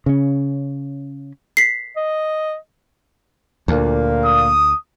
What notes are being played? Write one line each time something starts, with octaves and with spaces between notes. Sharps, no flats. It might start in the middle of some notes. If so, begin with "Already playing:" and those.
C#3 C#4
B6 C7
D#5
D2 A#2 A#3
D#6